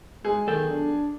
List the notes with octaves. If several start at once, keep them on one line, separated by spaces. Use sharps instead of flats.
G#3 G#4
B1 D#3 A4 G5
D4